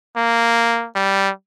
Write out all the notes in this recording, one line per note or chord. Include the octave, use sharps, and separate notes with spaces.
A#3
G3